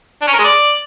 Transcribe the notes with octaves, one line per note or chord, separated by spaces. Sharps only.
D4
C#4
A#4
G#3
D5